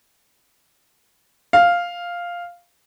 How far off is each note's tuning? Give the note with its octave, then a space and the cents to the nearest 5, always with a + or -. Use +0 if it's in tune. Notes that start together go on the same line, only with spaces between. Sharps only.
F5 +0